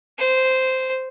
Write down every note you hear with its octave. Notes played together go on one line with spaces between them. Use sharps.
C5